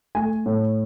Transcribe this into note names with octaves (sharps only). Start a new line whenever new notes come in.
A3 G#5
A2